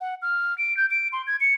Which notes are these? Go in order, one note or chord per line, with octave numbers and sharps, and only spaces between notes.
F#5
F6
D7
G6
D7
C6
G#6
C#7